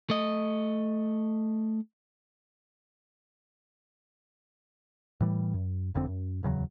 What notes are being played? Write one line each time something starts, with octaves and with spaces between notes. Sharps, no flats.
A3 D#5
A2 E3 G3
F#2
F#1 F2 D3 C4
F#2
D1 E2 C#3 F#3